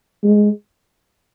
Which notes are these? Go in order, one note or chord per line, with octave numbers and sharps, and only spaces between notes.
G#3